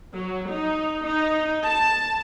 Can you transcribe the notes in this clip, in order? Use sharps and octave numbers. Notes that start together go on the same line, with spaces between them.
F#3
D#4
D#4
A5